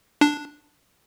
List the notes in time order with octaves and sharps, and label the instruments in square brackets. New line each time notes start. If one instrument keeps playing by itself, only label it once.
[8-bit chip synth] D4